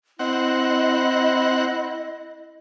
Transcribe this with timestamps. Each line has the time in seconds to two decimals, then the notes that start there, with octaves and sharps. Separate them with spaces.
0.19 C4 E4 D#5 F#5